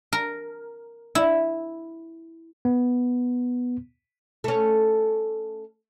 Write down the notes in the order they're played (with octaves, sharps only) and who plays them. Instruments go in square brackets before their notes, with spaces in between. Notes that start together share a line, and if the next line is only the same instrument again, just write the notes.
[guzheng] A#4
E4
[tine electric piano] B3
[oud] A3 C#4